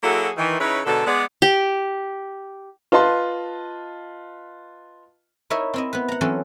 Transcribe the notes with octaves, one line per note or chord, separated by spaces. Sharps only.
F#3 A#3 E4 F#4 G#4 A4
D#3 E3
C#3 D#4 E4 B4 C#5
G#2 B2 D3 A4
G#3 B3 D5
G4
F4 B4 D#5 A5 C6
D#4 E4 A#4 C#5 E5
C4 E4 D#5
B3 B4
F#5 A#5
E3 F#3 C4 C#4 A4